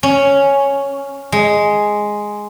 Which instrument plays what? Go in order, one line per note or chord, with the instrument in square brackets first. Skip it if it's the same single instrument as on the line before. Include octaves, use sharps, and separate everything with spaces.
[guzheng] C#4
G#3